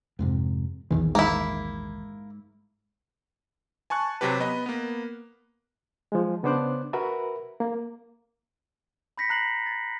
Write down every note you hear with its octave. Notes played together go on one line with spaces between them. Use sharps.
F2 G#2 C3
A#1 E2 D#3 E3
G#2 A#3 E4
G#5 A5 C#6 F#6
C3 F#3 G4 B4
B3 D#5 B5
A#3 B3
F3 G#3
C#3 B3 D4 C5 D6 F#6
F#4 A#4 B4 E5 B5
A#3
B5 G6 A#6 B6 C#7
A#5 F#6 C7 F#7
A6